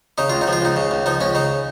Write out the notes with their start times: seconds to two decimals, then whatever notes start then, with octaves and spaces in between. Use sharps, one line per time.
0.18 C#3 D#4
0.30 C#2 F4
0.41 D#4
0.47 F3
0.53 F4
0.62 C#2 D#4
0.76 C#3
0.91 C#2
1.06 F3 D#4
1.20 C#2 C#4
1.35 C#3 D#4